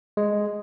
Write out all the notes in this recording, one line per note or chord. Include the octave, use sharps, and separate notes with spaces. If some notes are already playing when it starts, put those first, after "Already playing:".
G#3